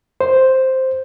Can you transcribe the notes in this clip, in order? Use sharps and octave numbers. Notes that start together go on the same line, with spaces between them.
C5